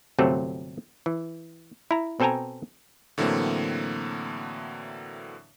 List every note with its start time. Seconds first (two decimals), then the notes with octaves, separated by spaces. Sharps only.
0.18 G1 C3 F#3 A3 C4 A4
1.06 E3
1.91 E4 A#5
2.20 B2 C4 A4 G5 G#5 A#5
3.18 A2 D3 E3 F#3 A#3 C4